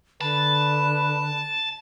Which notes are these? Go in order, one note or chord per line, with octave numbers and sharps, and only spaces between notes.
D3 B4 A5